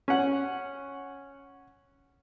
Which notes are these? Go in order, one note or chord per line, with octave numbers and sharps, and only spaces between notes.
C#4 F#5